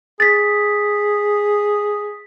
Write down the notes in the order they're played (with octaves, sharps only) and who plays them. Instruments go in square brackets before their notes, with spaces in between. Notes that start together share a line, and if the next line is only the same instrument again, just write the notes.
[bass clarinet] G#4 [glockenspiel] A6 B6